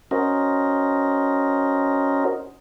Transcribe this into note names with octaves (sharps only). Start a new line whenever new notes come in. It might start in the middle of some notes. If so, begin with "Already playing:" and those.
C#4 F#4 A#4 C5 D#5